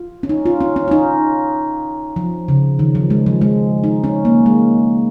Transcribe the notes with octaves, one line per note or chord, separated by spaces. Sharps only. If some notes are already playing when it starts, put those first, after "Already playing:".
Already playing: F4
C#4
D#4
F4
C#4
C#4
F4
D#4
F3
C#3
D#3
F3
G#3
F3
G#3
D#4
C#4
A#3
G#3